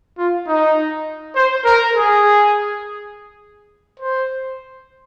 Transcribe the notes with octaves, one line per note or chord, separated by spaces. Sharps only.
F4
D#4
C5
A#4
G#4
C5